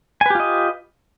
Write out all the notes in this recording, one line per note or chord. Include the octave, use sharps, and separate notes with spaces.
F4 G4 B4 D#5 G#5